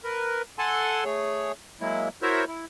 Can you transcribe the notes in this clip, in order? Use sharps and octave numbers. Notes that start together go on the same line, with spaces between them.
A#4 B4
A4 F#5 G#5 A5 C6
A3 G#4 C#5
F#3 G#3 A#3 E4
E4 F#4 A#4 C5 C#5 E5
E4